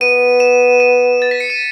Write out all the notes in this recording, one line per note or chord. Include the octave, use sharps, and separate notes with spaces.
B3 D#7
E7
D#7
A6
B6
C#7
D#7